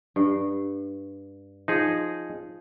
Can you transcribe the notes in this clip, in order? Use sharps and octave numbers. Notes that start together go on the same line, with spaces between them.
G2
F3 D#4 G#4